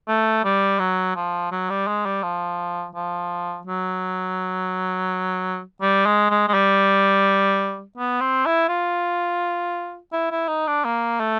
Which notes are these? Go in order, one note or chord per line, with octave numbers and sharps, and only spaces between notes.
A3
G3
F#3
F3
F#3
G3
G#3
G3
F3
F3
F#3
G3
G#3
G#3
G#3
G3
B3
C4
E4
F4
E4
E4
D#4
D4
A#3
A3